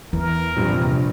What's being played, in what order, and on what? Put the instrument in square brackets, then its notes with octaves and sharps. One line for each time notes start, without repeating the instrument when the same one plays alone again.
[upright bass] E2 [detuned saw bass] E3 [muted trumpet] A#4
[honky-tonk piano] A#1 G2 [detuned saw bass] C3